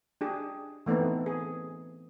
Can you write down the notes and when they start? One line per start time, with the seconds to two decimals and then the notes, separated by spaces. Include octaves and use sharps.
0.21 D4 G4 G#4
0.86 E3 A3 B3 C4 D#4
1.26 G#4